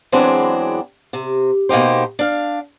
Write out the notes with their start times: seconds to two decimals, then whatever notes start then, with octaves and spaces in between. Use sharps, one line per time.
0.12 E2 E3 F#3 G#3 C4 D4
1.13 C3
1.69 B2 A#3 D#4 G4 C5
2.19 D4 F5